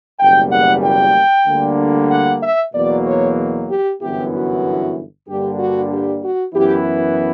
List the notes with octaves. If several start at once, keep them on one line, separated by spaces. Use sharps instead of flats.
F#1 E2 B2 G3 A#3 G5
F#5
G5
D2 D3 G3 A#3 D4
F#5
E5
E2 B2 F#3 A#3 D5
C#5
G4
G1 F#2 E3 B3 E4 G4
F#4
G2 D3 G3 A#3 D4 G4
F#4
G4
F#4
F#2 E3 B3 E4 G4